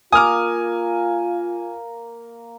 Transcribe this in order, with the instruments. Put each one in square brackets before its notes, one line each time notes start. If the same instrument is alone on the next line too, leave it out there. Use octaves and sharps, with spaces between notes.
[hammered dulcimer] A#3 [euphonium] F4 [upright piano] G#5 F6 [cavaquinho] D6 D#6